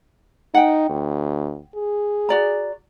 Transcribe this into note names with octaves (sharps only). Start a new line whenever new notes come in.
D#4 F#5 G5
D2
G#4
F#4 D5 A#5